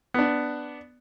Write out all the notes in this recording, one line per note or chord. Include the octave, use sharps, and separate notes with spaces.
B3 D4